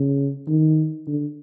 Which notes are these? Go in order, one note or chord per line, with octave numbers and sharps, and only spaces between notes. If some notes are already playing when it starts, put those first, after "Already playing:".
Already playing: C#3
D#3
D3